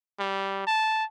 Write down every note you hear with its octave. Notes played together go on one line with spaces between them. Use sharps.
G3
A5